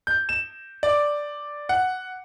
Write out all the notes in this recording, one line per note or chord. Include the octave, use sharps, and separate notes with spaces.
G6
E7
D5
F#5